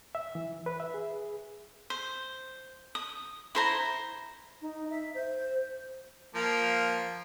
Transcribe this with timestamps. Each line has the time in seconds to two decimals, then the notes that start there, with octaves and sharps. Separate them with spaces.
0.15 E5
0.35 E3
0.66 B4
0.80 E5
0.94 G#4
1.90 C5
2.95 D#6
3.55 E4 C5 A#5
4.62 D#4
4.90 E5
5.15 C5
6.35 F3 A#3